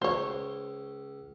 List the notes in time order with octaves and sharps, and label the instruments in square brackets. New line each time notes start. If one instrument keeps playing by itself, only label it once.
[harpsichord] C#2 [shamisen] C5 C#5